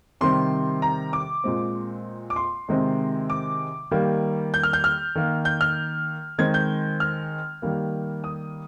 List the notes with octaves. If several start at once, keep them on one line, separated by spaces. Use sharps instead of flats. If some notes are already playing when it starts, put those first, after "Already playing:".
C3 D#3 G3 C4 C6
A#5
D6
A#2 G#3 C4
D6
C6
C3 D#3 G#3 C4
D6
D#3 G3 A#3
G6
F6
G6
F6
D#3 A#3
G6
F6
D#3 G#3 C4 G#6
G6
F6
D#3 G3 A#3
D#6